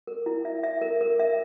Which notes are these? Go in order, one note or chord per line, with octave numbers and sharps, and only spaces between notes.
A#4
E4
E5
E5
A#4
A#4
E5